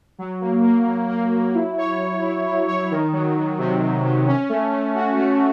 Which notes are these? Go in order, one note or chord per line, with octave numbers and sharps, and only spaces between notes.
F#3
A#3
A#3
F#3
A#3
F#3
E4
C#5
E4
E4
C#5
C#5
D#3
F#3
D#3
C3
C3
C3
C#4
A3
A3
F#4
A3